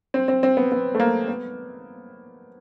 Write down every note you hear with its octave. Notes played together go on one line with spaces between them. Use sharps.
C4
C4
C4
B3
B3
A3
A#3
B3